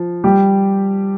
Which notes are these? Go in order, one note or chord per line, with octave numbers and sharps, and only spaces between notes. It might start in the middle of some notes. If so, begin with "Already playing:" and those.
Already playing: F3
G3 G4